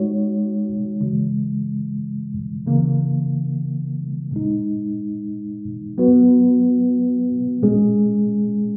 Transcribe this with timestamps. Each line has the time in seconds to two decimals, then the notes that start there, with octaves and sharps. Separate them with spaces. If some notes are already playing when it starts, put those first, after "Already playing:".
Already playing: G#3 D#4 F#4 C#5
1.01 C#3 E3 G#3
2.66 C#3 E3 A#3
4.31 A#2 G#3 D#4
5.98 F#3 B3 F#4 B4
7.63 A#2 G#3 C#4 G#4